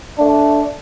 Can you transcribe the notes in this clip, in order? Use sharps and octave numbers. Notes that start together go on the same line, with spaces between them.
A3 D4